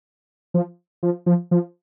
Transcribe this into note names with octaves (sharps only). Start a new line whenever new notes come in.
F3
F3
F3
F3